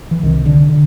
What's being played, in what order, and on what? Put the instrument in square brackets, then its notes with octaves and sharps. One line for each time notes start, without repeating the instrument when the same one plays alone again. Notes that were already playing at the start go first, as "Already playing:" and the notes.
[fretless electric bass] E3
C2 C3 D#3
D3
D3